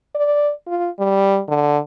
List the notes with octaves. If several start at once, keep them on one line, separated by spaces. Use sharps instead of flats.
D5
F4
G3
D3